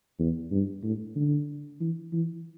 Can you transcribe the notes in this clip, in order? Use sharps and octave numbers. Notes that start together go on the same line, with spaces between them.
E2
G2
A2
D3
E3
E3